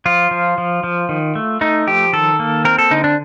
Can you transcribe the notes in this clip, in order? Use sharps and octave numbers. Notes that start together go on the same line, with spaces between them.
F3 F4
F3
F3
F3
D#3
A3
A3 D#4
F3 G4
D#3 A4
A#3
C4 A#4
A4
D3 D#4
D4